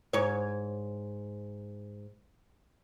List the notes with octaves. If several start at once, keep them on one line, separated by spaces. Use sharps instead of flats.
G#2 C#5